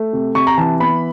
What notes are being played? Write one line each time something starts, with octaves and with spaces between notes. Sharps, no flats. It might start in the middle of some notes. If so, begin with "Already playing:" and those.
Already playing: A3
C3
C3 C#6
A#5
E3 A5
B3 B5